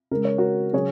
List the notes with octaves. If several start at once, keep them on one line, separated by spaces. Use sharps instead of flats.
C#3 G#3 A#4
C#5
F#4 A#4
C#3 F#3 G#4 C#5